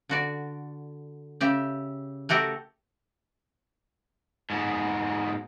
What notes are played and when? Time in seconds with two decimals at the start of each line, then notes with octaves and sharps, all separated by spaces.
0.09 D3 F#4 D5
1.41 C#3 G4 E5
2.29 A3 F#4 G4 A4 A#4
4.50 G#2 B2